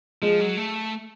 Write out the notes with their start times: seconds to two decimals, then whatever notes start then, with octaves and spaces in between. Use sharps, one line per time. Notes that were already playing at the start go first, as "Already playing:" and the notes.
0.22 F3 G#3
0.40 F#3
0.57 A3